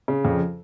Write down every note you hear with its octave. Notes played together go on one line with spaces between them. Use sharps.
C#3
F2